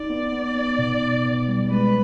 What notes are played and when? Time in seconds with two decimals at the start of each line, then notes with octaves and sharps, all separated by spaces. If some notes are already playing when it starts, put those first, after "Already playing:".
Already playing: D#4 D5
0.09 B3
0.32 B3
0.55 B3
0.78 B2
1.01 B2
1.25 B2
1.48 G3
1.70 G#3 B4